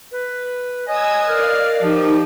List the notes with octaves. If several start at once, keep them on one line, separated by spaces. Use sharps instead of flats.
B4
B4 C#5 D#5 G#5 D#6 E6 G#6
A#4 D5 F5 F6
F3 D#4 G4